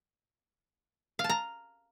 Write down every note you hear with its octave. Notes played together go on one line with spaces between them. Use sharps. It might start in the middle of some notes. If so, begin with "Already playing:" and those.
F5
A5
A#5